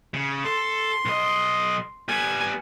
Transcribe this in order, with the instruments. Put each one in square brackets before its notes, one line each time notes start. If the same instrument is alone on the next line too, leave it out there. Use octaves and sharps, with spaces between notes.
[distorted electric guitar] C#3
[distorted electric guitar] A4 [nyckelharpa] C6
[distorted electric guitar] B1 D#5
[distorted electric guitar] G3 B3 [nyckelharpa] G#5